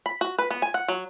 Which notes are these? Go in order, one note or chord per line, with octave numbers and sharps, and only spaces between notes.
B5
F#4
B4
B3
G#5
F#5
F#3